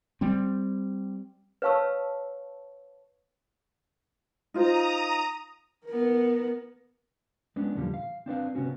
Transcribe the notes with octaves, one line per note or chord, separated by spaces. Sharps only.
G3 C4
B4 C#5 F5 A5 C#6 E6
D#4 F4 C5 A#5 D#6
B3 A#4
G#3 B3 C#4 D4
E2 A#2 D3 F3 G3
F5
C4 D4 B4 F5
C3 B3 C#4 F#4